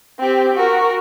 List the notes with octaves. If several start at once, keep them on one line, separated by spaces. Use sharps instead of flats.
C4 G4
F#4 A#4